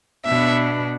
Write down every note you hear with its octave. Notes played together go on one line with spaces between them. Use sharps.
B2 B3 D4 E5